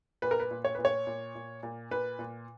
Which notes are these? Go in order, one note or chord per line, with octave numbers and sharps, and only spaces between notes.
A#2 B4
A#4
B4
A#2
C#5
A#2 B4
C#5
A#2
A#2
A#2
A#2 B4
A#2